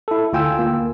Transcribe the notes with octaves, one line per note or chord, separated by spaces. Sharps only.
E4 A4
D2 F4 G5 G#5 E6
A#3